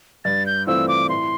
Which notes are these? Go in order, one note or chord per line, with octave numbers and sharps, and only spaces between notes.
G2 A6
G6
E3 A3 C4 F4 E6
D6
A2 C6